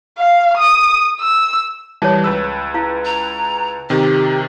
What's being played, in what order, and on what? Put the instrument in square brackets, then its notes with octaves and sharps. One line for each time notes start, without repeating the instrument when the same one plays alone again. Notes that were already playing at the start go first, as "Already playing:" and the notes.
[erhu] F5
D#6
E6
[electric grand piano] E3 G3 [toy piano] C#5 A5
[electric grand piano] C#2 B4 E6
[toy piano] E4 F5
[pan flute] A#5
[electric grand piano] C3 D#3 [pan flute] G4